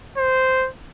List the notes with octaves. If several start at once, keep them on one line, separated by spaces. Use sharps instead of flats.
C5